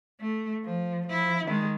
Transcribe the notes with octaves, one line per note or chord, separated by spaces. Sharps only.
A3
F3
F3 E4
D#3 G#3